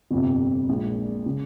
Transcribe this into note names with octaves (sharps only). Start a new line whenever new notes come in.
G1 F2 C3
A#1 A#2 G#3
C#3